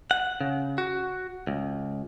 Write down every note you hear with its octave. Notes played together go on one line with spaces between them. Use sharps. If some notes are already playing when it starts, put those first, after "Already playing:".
F#5
C#3
F#4
C#2